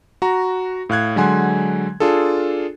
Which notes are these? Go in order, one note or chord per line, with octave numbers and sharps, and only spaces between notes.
F#4 A#5
A2 F5 F#6 G#6
D3 F#3 G#3 F#5 G#5 C6
D4 F4 G#4 A4